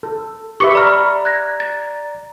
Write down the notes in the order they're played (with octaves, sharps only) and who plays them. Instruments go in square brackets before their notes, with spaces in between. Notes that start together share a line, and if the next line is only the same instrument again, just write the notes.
[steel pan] A4
[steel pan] G4 B4 E5 [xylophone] C#6 D6 C#7
[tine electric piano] D5 A#5 [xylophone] B5 F6
[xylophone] F#6 G#6 A#6
A6